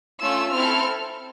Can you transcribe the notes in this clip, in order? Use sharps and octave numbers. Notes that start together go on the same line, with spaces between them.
A3 C#4 F4 E6
C4 E4 A4 F6